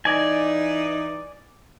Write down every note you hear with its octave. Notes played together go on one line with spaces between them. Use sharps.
E3 D#4 D5 G#5